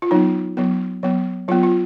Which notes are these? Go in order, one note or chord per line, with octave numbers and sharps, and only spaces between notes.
F4
F#3 B3 D#4
F#3 B3
F#3 B3
F#3 B3 F4
F4